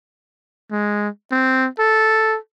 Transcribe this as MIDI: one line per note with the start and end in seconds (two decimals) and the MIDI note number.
0.71 1.08 56
1.32 1.68 60
1.79 2.38 69